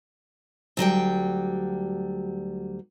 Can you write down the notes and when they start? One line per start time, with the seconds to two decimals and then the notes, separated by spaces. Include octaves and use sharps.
0.77 D2 F#3 G3 G5